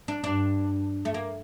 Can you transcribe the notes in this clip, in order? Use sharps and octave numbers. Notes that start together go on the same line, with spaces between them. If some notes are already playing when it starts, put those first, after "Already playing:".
D4
G2 D4
A3
A#3